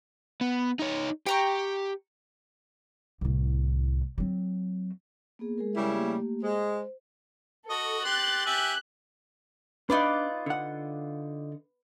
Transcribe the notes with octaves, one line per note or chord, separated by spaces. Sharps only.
B3
D#4 C#5
G4 G5 A#5 C#6
C2 A2
F#3 C4
A#3 B3 G#4
G#3 G#4 A#4
C#3 G3 E4
A3 A#3 G4
G#3 C5
F#4 A4 D#5
G4 C6 F#6 A6
G4 E5 G#5 F#6
D4 D#4 F4 B4 D5
D3 F#5